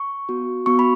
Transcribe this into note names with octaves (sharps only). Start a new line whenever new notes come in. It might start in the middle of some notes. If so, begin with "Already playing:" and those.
Already playing: C#6
B3 F#4
B3 F#4 C#6
B5